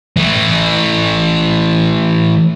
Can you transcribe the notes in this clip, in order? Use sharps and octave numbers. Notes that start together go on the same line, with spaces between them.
E3 A3